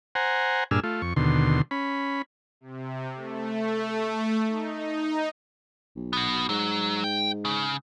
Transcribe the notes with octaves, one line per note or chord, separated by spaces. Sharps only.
C5 F#5 G#5 A#5
G2 A#2 D4 G#4 E6 F6
A3 F4
F2 C#6
D#2 B2 D3 C6
C#4 B5
C3
A3
D#4
B1
B3 F#4
G#2 F#3
G5
C#3